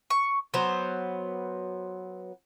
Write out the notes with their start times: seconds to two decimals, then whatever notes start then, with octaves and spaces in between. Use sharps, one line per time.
0.10 C#6
0.54 F#3 B3 C5